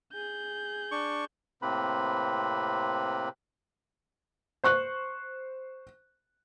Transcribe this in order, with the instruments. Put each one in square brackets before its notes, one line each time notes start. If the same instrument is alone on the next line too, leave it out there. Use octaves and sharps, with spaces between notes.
[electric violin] G#4 G6
[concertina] D4 C#6
[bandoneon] A2 C3 A#3 C4 B4 B5
[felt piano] C5 C#6 F#6